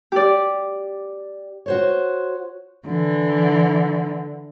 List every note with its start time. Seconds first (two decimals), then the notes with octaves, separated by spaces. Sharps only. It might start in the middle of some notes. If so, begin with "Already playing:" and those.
0.12 G4 D5
1.66 F#4 C5 C#5
2.86 D3 E3